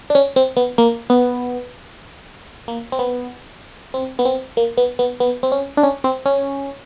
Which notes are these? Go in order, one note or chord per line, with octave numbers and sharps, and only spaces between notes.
D4
C#4
C4
B3
A#3
B3
A#3
C4
B3
C4
B3
C4
A#3
B3
B3
B3
C4
C#4
D4
C#4
C4
C#4